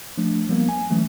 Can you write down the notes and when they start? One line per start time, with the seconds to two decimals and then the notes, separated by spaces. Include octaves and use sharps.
0.18 F3 A3 D4
0.49 F3 G3 A#3 B3
0.69 G#5
0.90 E3 F#3 A3 C#4